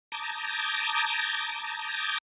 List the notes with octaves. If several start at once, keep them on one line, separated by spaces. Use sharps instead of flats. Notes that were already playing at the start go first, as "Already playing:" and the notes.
A5 A#5 D6 D#6 G6 G#6